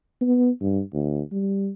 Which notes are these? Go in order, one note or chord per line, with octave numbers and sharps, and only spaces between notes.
B3
G2
D2
G3